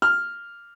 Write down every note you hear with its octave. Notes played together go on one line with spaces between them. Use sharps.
F6